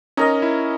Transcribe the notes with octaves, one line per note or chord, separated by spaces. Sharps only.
C#4 D#4 A#4 D#5
E4